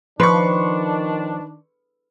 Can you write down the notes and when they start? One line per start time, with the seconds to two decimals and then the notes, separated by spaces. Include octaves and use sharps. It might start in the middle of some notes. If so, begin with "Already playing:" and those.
0.20 D#3 F3 D4 B4 C6 C#6